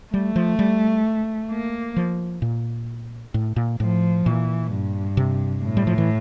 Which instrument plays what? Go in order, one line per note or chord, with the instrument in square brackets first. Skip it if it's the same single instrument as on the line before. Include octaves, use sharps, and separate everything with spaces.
[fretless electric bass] G3 [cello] A3
[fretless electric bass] F3
G3
[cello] A#3
[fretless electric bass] F3
A#2
A2
A#2
[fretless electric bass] A2 [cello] F3
[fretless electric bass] A#2 [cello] E3
[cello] G2
[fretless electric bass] C3
[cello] A2
[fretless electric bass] G3
F3
E3